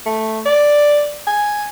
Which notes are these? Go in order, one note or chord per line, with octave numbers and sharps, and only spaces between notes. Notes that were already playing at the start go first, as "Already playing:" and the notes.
A3
D5
G#5